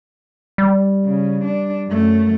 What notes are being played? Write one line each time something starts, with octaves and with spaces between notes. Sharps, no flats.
G3
C#3
D4
F#2 A3